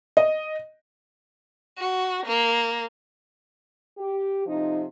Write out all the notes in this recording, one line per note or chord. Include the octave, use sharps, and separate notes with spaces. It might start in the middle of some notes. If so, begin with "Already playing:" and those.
D#5
F#4
A#3
G4
C3 F3 D#4